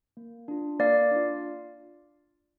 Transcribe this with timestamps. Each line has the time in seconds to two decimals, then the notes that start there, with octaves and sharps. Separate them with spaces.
0.17 A#3
0.48 D4 F4
0.79 A#3 D5 F5
1.11 D4 F4